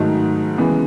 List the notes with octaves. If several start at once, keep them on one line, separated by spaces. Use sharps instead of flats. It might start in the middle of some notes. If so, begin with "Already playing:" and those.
Already playing: G#2 D#3 F#3 A3 D#4
C#3 E3 G#3 B3